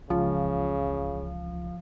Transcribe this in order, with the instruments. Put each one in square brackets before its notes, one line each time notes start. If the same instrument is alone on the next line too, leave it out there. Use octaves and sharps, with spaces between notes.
[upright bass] C#2 E3 [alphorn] C#3 [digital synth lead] F3